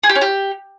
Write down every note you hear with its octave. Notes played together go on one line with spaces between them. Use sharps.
G#4
G4
C#4
G4